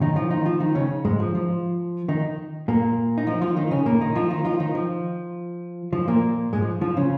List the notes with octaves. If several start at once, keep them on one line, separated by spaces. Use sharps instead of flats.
D#3 D#4
F3 F4
D#3 D#4
F3 F4
D#3 D#4
C#3 C#4
G#2 G#3
F3
F3
D#3 D#4
A#2 A#3
D#4
F3 F4
F3 F4
D#3 D#4
C#3 C#4
A#2 A#3
D#3 D#4
F3 F4
D#3 D#4
F3 F4
D#3 D#4
F3
F3
A#2 A#3
G#2 G#3
F3
F3 F4
C#3 C#4